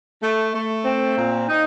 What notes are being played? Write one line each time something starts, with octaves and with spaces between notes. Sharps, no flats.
A3
A3
C4
A#2
D#4